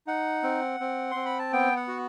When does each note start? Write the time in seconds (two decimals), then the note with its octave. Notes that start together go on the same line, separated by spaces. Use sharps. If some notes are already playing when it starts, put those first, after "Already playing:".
0.07 D#4 F#5
0.43 C4
0.80 C4
1.11 C4 C6
1.25 B5
1.39 A5
1.53 B3 G5
1.76 F#5
1.88 F#4